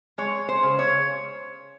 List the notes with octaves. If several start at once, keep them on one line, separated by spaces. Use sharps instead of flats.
G#3 C#5
C5
C#3
C#5